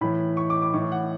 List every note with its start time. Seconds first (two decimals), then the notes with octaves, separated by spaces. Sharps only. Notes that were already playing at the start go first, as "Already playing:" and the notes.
0.01 A2 E3 B5
0.37 C#6
0.50 D6
0.62 D6
0.74 A2 E3 C#6
0.92 F#5